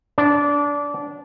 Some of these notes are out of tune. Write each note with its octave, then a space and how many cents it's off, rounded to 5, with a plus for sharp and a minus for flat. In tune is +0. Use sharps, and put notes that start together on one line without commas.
D4 -20